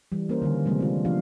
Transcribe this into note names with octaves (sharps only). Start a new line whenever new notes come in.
E3 G3
A#3 C#4 A#4 C5
D3 D#3 G3
C3 F3 G3 G#3 A#3 C4
G#3 D4 F4
F3 B3 D4 G4 F5